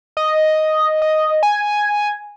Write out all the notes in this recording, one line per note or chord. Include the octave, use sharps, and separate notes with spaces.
D#5
D#5
G#5